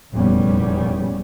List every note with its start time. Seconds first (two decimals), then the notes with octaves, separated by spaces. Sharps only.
0.14 F1 E2 A#2 G3 B3 C#4